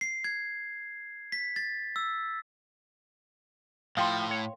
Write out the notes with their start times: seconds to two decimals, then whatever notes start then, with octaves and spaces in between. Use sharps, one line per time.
0.01 C7
0.24 G#6
1.32 B6
1.56 A6
1.96 E6
3.97 A2 F3 A4 F5 G5 C6
4.31 C#5